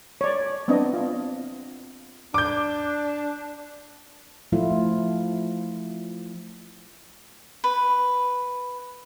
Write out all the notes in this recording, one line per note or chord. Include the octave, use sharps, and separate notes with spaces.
C#5 D5
B3 C4 D4 E4 D#5
F4
D4 D6 G6
F3 A3 E4 F4
B4